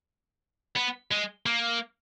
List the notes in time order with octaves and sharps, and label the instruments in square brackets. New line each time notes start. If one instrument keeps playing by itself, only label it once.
[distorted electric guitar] B3
G#3
A#3